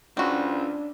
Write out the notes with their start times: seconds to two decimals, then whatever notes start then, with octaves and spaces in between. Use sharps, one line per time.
0.17 C#2 C4 D4 F#4
0.51 D4